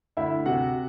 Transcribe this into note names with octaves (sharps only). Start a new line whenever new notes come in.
D2 E4 E5
C3 F#4 F#5